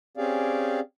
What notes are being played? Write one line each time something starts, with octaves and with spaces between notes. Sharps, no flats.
C4 C#4 G4 G#4 D5 F5